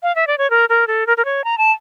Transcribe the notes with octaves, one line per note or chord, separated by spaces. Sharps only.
F5
E5
D5
C#5
A#4
A#4
A4
A#4
A#4
C#5
A#5
A5